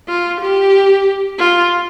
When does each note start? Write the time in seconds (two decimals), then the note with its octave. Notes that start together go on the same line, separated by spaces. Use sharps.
0.08 F4
0.41 G4
1.38 F4